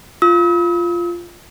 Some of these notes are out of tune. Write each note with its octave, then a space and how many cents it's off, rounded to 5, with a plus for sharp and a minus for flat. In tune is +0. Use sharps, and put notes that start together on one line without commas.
F4 -10 E6 -45